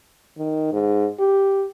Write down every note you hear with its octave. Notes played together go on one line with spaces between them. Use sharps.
D#3
G#2
G4